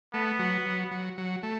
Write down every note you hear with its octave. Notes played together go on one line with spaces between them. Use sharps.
A3 B3
F#3
F#3
F#3
F#3
A3